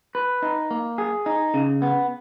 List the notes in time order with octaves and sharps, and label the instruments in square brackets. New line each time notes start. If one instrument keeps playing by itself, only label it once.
[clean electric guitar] B4
D#4
A#3
G#4
D#4
C#3
B3